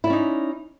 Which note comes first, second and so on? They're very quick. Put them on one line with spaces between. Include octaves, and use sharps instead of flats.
E4 D5 C#4 D#4